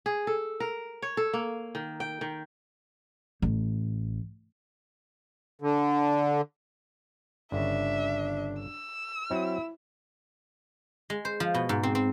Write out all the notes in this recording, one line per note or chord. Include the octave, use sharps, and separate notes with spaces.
G#4
A4
A#4
C#5
A4
A#3
D#3
G5
D#3
A1
D3
G1 C#3 D4 E5
E6
F#3 C4 E4
G#3
C5
F3
B2
G#2
C4
C4